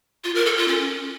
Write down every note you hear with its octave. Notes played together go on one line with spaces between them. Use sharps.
F4
A#4
A4
F4
C#4